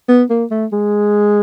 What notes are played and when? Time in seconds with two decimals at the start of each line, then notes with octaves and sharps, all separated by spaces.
0.08 B3
0.30 A#3
0.51 A3
0.72 G#3